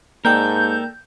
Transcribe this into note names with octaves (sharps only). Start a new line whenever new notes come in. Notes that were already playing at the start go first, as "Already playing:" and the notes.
G#2 A#3 A4 A#4 D5 G5 G6